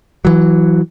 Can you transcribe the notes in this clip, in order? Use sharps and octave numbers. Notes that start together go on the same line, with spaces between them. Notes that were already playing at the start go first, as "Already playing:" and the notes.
E3 F#3